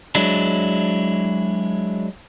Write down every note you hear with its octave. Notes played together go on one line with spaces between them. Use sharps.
F#3 G#3 D4 E4